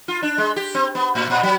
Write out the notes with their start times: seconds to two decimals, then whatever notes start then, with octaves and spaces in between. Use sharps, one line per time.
0.08 F4
0.22 D4
0.38 G#3
0.56 G4
0.75 C4
0.95 B3
1.15 A2
1.30 A#2
1.43 F#3